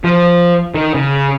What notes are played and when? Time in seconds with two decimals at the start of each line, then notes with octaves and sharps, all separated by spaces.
0.04 F3
0.75 D#3
0.94 C#3